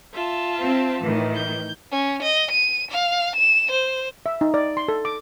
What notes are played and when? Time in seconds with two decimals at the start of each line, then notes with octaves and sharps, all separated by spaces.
0.13 F4 E5 A5
0.61 C4
1.01 A2 D#3 E3
1.34 G6
1.92 C#4
2.23 D#5
2.51 D#7
2.91 F5
3.36 E7
3.71 C5
4.26 E5
4.41 D#4
4.54 D5
4.77 C6
4.88 A4
5.05 D6